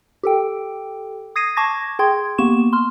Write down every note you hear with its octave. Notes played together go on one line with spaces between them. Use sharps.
G4 A4 G5
D#6 G#6 A#6 C7 D#7
A5 C#6 D6 G#6 A#6
G#4 G5 C6 G#6
A#3 B3 G4 C#6 E7
C6 F6